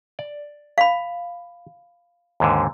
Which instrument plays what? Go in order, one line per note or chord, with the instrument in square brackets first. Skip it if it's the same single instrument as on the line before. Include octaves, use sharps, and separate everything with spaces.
[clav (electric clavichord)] D5
[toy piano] F5 B5
[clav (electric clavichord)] D#2 G#2 D3